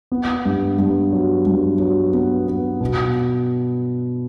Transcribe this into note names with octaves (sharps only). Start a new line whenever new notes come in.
B3
G2
G2
F#3
G2
F#3
B3
B3
B2